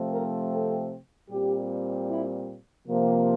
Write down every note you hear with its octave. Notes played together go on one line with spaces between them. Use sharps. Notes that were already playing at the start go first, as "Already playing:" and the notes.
Already playing: C3 F3 A3 C4
A#4
A4
A#2 G3 C4 G4
E4
C3 F3 A#3